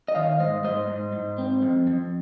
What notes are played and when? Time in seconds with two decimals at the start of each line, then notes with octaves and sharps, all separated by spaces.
0.08 D#5
0.15 D#3 C#5 F5
0.39 G#2 C5 D#5
0.64 G#2 C5 D#5
0.88 G#2
1.13 G#2
1.38 C4
1.62 F2
1.87 F2